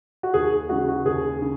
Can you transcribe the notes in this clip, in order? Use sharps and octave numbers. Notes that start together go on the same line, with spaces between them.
F#4
D#2 G#4
G#4
C#3 E3 G#3 F#4
F#4
D#2 G#4
C#3